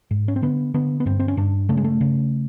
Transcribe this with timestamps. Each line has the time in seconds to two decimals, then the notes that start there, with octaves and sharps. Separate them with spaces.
0.11 G#2
0.28 C#4
0.36 C4
0.42 D3 B3
0.74 D3 B3
1.00 B3
1.06 G2 C4
1.20 C4
1.28 C#4
1.37 G2 D4
1.69 C#3 A3
1.77 G#3
1.84 A3
2.01 C#3